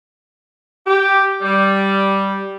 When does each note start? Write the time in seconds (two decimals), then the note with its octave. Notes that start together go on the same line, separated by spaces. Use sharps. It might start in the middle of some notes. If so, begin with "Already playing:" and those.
0.86 G4
1.42 G3